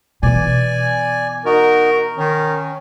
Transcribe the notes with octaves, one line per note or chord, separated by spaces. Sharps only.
B2 E3 D5 G#5
D#4 F#4 A#4
D#3 C#4